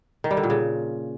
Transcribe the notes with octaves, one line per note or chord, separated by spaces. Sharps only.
D#3
G3
D3
A#2
C#3